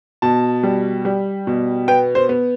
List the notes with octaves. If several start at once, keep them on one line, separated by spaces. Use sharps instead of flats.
B2 A5
G3
G3
B2
B3 G5
C5
B3